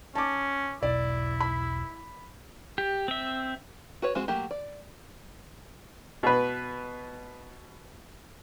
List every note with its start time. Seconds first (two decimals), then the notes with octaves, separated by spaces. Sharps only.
0.15 C#4 A5 D6
0.83 E1 B1 E4 D5
1.40 B5
2.78 G4
3.08 C4 E5
4.02 F#4 B4 C#5
4.15 G#3 C4 F#4
4.28 F#3 A3 A#3 G4
4.51 D5
6.23 B2 B4